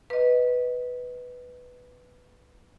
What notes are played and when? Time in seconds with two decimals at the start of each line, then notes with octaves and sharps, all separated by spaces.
0.10 B4 D#5